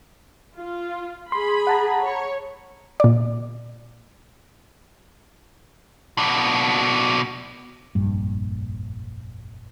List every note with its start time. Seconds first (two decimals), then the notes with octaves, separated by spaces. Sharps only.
0.57 F4
1.32 G#4 B5 C6
1.67 F#5 A5 A#5
2.04 C#5
3.00 A#2 D5
6.18 B2 D4
7.95 F1 A#1 G2